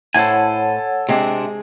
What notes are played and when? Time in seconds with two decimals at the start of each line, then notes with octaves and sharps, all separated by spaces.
0.14 A2 E4 A4 C5 C#5 F#5 G#5
1.09 C3 G#3 C4 D4